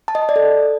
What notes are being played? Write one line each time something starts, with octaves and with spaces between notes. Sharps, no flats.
A5
D#5
A5
D5
A4